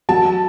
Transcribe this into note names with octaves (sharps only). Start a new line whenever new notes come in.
F#3 A5